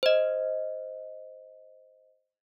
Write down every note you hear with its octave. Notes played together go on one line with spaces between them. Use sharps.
C5 D#5